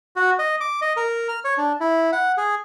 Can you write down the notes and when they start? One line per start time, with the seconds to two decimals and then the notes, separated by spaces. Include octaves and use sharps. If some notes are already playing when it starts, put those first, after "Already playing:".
0.16 F#4
0.39 D#5
0.61 D6
0.81 D#5
0.97 A#4
1.28 F6
1.45 C#5
1.58 D4
1.81 E4
2.12 F#5
2.37 G#4